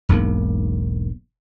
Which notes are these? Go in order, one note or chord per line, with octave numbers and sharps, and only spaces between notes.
E1 B1 G#2 A#3